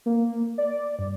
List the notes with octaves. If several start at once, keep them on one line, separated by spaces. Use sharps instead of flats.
A#3
D5
G2